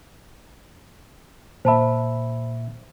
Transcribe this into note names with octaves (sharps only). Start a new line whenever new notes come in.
A#2 C5 E5 A5 B5